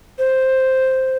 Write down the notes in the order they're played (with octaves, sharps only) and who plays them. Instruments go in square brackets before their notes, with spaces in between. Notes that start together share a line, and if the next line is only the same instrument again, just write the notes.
[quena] C5